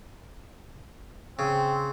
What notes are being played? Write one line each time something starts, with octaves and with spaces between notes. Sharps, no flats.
C#3 C4